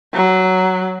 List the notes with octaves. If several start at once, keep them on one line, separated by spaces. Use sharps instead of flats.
F#3